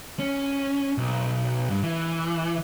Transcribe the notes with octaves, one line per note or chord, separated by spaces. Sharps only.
C#4
B1
G2
E3